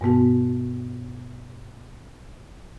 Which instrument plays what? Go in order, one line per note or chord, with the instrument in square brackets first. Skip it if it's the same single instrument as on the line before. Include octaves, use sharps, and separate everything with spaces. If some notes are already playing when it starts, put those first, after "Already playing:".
[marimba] G2 B2 B3 F#4